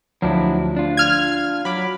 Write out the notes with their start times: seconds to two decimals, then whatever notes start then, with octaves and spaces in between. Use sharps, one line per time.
0.22 D2 F3 F#3 D4 E4
0.77 D4 F4
0.97 F6 G#6
1.65 F#3 B5 D6